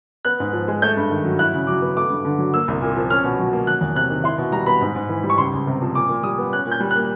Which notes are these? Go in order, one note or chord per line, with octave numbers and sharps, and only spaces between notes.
B3 F#6
G#2
F3
G#3
A3 G6
G2
D#3
F#3
E4 F#6
C#3
F#3 D6
B3
A3 D6
G2
D3
F#3
A#3 E6
C2
A#2
F3
C#4 F6
B2
F#3
A#3
F#3 F#6
E2
C3 F#6
D#3
E4 C6
B2
G3 A#5
B3 B5
G#2
G#2
E3
G3
C#6
C#2 C6
C#2
C3
F3
A#2 D6
A#2
G3 D#6
B3
C#4 F#6
A#2 G6
G3
F#6
A#3